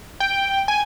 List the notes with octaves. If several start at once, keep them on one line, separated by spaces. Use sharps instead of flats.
G5
G#5